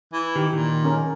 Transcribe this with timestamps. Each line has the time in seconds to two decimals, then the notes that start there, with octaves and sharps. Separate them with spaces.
0.13 E3
0.36 D#3 G4
0.53 A#2 D#3
0.84 C#4 A#4